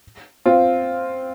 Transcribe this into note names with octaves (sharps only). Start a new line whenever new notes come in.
C4 F4